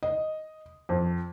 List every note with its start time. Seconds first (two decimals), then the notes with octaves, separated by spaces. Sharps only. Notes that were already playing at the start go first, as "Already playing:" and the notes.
0.03 D#5
0.89 F2